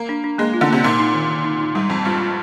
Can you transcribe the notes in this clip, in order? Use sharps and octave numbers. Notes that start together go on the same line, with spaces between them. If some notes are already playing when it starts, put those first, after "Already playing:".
Already playing: A#3
D4
D4
G#3 A#3
F4
D3
C3 A#3
A#2 D#4
D#4
D#3
D#3
D#4
D#4
G#2 G3
F2 C4
G2 F4
F4